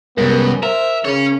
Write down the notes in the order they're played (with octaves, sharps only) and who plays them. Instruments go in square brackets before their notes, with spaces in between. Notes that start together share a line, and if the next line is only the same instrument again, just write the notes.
[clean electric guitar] C2 G#3 [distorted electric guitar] F#2 [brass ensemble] B3 G4 A#4
[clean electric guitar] A#4 [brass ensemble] C5 [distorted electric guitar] E5
[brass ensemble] C#3 [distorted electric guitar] C#4 C#5